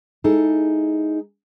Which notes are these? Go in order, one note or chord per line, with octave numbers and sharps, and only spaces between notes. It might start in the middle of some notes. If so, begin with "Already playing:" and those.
G#3 D#4 E4 G#4 A4